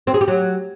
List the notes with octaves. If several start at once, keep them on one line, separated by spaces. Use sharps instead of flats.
C4
G#4
G4
F#3